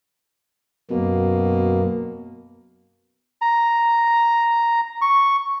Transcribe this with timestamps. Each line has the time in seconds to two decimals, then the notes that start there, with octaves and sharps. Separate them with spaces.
0.91 F#2 B2 A#3
3.42 A#5
5.01 C#6